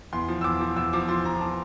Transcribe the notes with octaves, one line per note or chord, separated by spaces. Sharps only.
E2 C6
F3
E6
E2 D6
F3
E2 E6
F3 D6
F3 C6
F3 A#5
A5